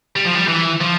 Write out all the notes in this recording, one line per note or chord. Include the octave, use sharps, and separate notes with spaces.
G3
F3
G3
E3
F3